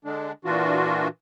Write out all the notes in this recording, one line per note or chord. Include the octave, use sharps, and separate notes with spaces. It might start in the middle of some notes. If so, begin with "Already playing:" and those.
D3 G#3 D4
A#2 E3 D4 F4 F#4